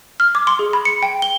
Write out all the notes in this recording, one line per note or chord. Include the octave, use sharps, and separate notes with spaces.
F6
D6
C6
G#4
B5
C#7
G5
G7